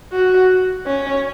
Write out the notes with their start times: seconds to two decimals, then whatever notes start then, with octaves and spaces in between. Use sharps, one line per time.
0.13 F#4
0.87 C#4